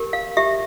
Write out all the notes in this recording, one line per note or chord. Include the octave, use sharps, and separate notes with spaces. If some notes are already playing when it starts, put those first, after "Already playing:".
Already playing: G4 A#4
F5
G4 E5